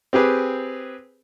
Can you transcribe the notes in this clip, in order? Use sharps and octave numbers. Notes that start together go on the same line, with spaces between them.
C4 G4 G#4 B4